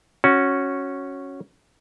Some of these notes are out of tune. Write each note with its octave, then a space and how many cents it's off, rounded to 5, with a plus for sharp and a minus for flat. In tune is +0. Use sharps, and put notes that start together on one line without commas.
C#4 -5 F#4 +0